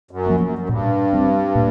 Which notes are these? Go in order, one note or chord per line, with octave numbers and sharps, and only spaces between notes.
F#2
F3 A#3 C#4
F#2
F#2
G2 A#2
G3 C4
A#2